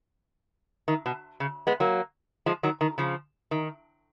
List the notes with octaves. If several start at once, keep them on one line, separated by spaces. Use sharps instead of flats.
D#3
B2
C#3
G#3 B3
F#3 A#3
F3 G#3
D#3 F#3
D#3
C#3 F3
D#3